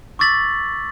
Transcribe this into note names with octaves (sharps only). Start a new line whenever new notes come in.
C#6 D6 E6 A6 B6 F#7